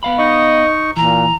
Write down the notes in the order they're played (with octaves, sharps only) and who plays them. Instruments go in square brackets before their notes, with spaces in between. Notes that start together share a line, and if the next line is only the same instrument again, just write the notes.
[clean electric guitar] B3 F5 B5
[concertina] D#4 C#6 [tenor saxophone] D#5
[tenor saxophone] A#2 [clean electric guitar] E3 [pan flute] A#5